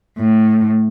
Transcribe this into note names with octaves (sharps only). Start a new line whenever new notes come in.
A2